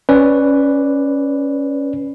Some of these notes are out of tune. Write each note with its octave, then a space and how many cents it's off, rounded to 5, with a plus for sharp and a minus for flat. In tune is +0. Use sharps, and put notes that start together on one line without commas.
C#4 +0 B4 +0 D5 +0